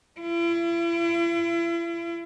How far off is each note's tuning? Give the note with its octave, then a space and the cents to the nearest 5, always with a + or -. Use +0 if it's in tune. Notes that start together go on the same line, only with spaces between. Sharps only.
E4 +40